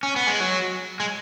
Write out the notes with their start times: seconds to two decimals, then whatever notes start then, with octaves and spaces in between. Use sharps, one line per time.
0.03 C#4
0.16 B3
0.27 G#3
0.40 F#3
1.00 G#3